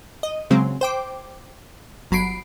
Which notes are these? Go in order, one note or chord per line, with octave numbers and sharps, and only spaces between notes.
D#5
C#3 F#3 G#3 C4
C5 G5 D6
G1 F#3 B5 C7 D7